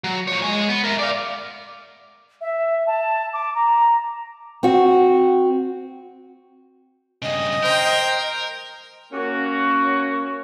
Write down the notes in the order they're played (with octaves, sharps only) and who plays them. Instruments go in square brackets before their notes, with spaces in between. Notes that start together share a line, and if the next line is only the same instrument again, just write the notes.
[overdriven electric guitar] F#3
F3 C#5
G#3 G#5
B3
A#4 E5
D5 F5
[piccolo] E5
A5
D6
A#5
[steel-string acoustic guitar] C4 F#4
[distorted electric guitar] G2 C#3 [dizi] D#5
[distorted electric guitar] A#4 [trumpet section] C5 G5
[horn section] A#3 C#4 F#4